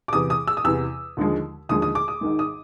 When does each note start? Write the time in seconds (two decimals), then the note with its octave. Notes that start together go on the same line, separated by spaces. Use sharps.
0.08 D6
0.13 E2 C3 E3 D#6
0.30 D#6
0.48 E6
0.57 D#6
0.64 E2 C3 E3 E6
1.17 D#2 D3 F3 G#3
1.69 D#2 D3 F3 G#3 D#6
1.82 D#6
1.95 D6
2.08 D#6
2.21 G#1 G#2 D#3 G#3
2.39 D#6